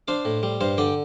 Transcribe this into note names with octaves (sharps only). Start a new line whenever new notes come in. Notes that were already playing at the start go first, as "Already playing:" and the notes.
D4 C5 F5
A2
G3
G2 C5 F5
D3 D5 G5